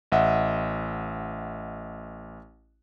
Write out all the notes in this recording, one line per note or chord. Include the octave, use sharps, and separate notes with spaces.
A1 D#5 E5 F#5